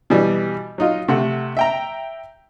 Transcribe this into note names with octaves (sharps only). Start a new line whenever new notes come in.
B2 E3 G3
F#3 D#4 F4
C3 A3 F#5
E5 G5 A#5